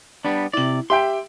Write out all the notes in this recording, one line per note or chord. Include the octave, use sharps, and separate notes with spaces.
G3 B3 D4
C3 E4 D5 F#7
G4 E5 G5 C6